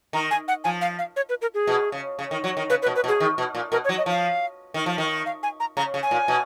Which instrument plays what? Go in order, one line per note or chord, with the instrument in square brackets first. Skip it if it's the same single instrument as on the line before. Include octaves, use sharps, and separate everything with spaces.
[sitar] D#3 [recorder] A#5
[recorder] G#5
F#5
[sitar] F3 [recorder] G#5
[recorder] F5
F5
C#5
B4
A#4
G#4
[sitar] B2
C#3
C#3
D#3
F#3
D#3
[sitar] C#3 [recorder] B4
[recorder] B4
[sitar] B2
[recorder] B4
[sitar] B2
[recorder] G#4
[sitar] D#3
B2
A#2
[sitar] B2 [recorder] A#4
[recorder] C#5
[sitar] F#3
[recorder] D#5
[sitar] F3 [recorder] F5
[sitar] D#3
F3
D#3
[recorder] F5
G#5
A#5
[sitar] C#3 [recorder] A#5
[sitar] C#3
[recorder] G#5
[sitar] A#2
B2